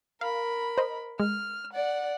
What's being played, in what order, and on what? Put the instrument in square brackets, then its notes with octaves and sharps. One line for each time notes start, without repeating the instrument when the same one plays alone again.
[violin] A#4 B5 [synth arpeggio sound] F5
[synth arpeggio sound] C5 D#5
[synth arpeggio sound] G#3 [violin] F6
[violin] D5 F#5